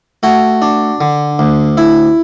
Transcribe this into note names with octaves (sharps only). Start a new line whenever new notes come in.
A3 F#4
D4
D3
D2
E4